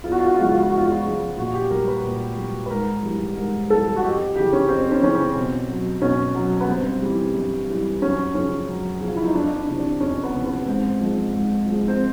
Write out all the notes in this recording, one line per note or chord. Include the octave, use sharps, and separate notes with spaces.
E2 F4
F#4
F4
F#4
F4
C#3 F3 G#3 F#4
F4
F#4
F4
E2 F#4
F4
F#4
F4
C#3 F3 G#3
A#2 F#4
G4
G3 A#4
B4
A#2
G3
B4
G#2 A#4
E3 G3
G#2 A#4
E3 G3 A4
F#4
F2 G4
C#3 E3 G4
C#4
F2 C4
C#4
C#3 E3 C#4
C4
B2
F#3
B2 C#4
F#3
B3
G2 C4
E3 G3
G2
E3 G3
F#2 C#4
C#3 F3 C#4
F#2
C#3 F3
F4
E4
D#4
F2 D4
D4
C3 E3
D4
F2 C#4
B3
C3 E3
B3
G#2 C4
F3 G#3
G#2
F3 G#3
C4